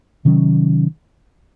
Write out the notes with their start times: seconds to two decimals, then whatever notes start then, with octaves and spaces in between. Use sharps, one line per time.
0.25 C3 D#3 F#3 C#4